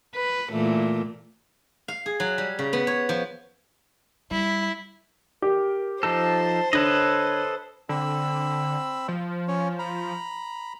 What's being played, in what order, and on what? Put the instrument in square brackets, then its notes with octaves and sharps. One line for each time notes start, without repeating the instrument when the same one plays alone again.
[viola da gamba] B4
A#2 E3 A3
[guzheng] F5
G#4
F#3
G3
C#3
B3
C#5
F3
[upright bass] G3 [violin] E4
[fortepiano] G4 [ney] A#4
[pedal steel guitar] F3 D#4 A4 [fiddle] C5 [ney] A5
[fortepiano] D3 [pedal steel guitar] A4 B4 D#5 [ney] C#5
[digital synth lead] D3 [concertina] C4 B5 E6
[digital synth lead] F3
[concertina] C#4 C#5
A#5 B5